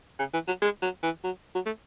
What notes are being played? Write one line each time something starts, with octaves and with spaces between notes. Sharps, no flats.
C#3
E3
F#3
G#3
F#3
E3
F#3
F#3
A3